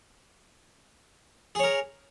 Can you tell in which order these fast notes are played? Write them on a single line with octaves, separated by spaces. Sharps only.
G#4 C#5 A#4